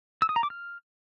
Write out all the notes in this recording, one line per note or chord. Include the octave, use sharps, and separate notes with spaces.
E6
D#6
A#5
D6
F6